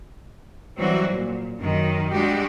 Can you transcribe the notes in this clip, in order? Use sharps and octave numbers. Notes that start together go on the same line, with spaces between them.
E3 F#3 G3 C4 F#4
A#2
F#2 D#3
G3 G#3 D4 F#4 G4